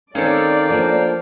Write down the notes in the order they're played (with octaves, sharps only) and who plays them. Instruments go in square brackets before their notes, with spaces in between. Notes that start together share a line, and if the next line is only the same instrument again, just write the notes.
[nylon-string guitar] D#3 C4 [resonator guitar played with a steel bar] C#4 A4 [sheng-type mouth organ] A#4 F5 G5 [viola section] D5
[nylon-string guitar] F3 A#3 D4